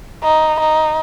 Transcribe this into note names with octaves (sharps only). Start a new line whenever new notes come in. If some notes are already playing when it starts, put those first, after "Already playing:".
D#4
D#4